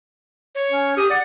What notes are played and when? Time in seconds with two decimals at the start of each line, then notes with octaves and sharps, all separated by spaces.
0.55 C#5
0.71 C#4
0.97 G4 D#6
1.10 D5 F#5